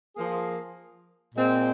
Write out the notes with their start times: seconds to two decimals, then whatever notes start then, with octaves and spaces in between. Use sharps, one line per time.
0.16 F3 A#3 G#4
1.35 A#2 G#3 C4